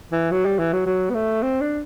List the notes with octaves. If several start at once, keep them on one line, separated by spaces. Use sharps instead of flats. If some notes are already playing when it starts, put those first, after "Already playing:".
E3
F#3
G3
E3
F#3
F#3
B3
A3
C4
D4